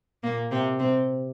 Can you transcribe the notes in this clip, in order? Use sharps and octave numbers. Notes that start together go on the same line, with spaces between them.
A#2 A#3
C3 C4
C3 C4